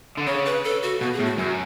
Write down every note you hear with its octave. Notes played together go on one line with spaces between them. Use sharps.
D3
C#3 C#5
B4
A4
F#4
B2 F#4
G#4
A2
F#4
F#2 F#4